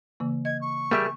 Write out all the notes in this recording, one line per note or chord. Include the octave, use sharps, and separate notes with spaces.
C#3 E3 A#3
D#5 G#6
C#6
G3 A3 A#3 G4 G#4 E5